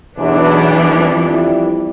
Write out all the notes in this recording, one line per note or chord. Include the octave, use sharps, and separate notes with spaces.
B1 E2 E3 B3 D4
F2 G3 E4